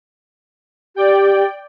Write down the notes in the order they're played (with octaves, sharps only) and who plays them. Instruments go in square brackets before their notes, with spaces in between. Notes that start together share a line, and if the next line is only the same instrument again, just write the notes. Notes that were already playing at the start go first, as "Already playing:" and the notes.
[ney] G4 [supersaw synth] D5 G5